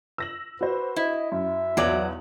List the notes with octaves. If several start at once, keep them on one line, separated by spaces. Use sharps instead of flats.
E6 A#6 F#7
F#4 B4 C5
E4 D#5
F#2 E5
B1 E2 F#3 D5 F#7